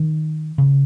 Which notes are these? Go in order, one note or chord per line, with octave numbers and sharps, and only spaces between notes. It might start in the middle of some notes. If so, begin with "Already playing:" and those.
Already playing: D#3
C#3